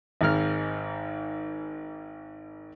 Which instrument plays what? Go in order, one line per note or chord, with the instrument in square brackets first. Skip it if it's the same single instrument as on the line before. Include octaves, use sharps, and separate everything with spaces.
[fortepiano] G#1 G#2 F6